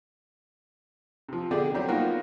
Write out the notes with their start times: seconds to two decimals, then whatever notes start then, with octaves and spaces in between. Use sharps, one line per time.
1.29 C3 F3
1.51 B2 D3 G4 G#4 D5
1.74 F#3 G3 C4 G4
1.88 A#3 B3 D#4 F4 F#4 A#4